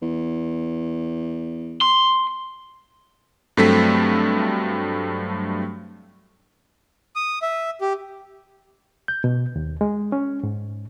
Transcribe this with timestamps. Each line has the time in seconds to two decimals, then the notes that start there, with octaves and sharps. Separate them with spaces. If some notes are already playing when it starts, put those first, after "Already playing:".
0.02 E2
1.81 C6
3.57 G2 F#3 A3 C4 A4 B6
7.16 D#6
7.42 E5
7.81 G4
9.08 G6
9.24 B2
9.56 D#2
9.81 G#3
10.12 C#4
10.43 G#2